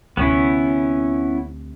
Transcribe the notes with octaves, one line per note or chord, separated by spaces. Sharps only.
D2 C3 B3 C#4 E4